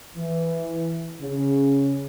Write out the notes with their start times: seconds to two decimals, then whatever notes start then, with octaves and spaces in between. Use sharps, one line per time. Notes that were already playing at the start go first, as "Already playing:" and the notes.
0.17 E3
1.21 C#3